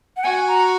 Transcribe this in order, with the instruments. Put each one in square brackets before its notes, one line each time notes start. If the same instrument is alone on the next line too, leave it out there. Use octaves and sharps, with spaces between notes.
[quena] F#5
[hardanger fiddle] F#4 [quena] G#5
[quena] A#5